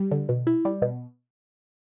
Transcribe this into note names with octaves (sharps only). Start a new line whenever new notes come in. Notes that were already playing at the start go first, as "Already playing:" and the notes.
Already playing: G3
D3
B2
E4
G3
B2